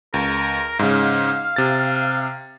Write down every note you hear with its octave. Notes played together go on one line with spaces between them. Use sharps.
C#2 A#4
G#2 C#3 F5
C3 A6